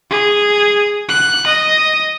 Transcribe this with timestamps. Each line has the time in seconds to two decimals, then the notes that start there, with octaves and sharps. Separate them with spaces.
0.10 G#4
1.09 F#6
1.47 D#5